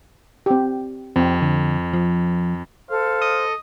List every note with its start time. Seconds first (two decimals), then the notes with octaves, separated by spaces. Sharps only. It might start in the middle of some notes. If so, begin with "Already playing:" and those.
0.46 C4 G4
1.16 F2 C4
1.42 D3
1.93 F3
2.90 A4 C5 F5
3.21 D#5